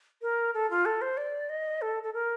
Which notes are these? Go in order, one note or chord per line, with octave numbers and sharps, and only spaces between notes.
A#4
A4
F4
A4
C5
D5
D#5
A4
A4
A#4